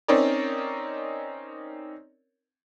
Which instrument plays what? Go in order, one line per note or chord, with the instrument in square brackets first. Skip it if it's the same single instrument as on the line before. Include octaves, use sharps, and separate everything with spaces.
[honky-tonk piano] C4 C#4 D#4 A#4 C#5 D5